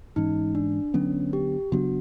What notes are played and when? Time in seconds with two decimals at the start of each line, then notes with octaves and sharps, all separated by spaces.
0.16 G#2 E3 G#3 C#4 D#4
0.55 D4
0.94 D3 F#3 B3 C#4 D4
1.33 G4
1.72 C#3 F#3 B3 D4 F#4